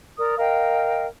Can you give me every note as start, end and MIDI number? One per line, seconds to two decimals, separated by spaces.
0.18 0.37 70
0.18 0.37 74
0.18 0.37 87
0.37 1.06 70
0.37 1.06 75
0.37 1.06 77
0.37 1.06 79